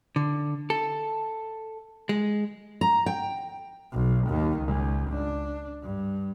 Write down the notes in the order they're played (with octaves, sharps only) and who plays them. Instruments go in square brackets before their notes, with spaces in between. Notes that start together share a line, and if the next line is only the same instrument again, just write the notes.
[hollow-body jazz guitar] D3
A4
G#3
[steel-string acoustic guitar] A#5
G5
[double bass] B1
D#2 D#3
C#2
D4
G2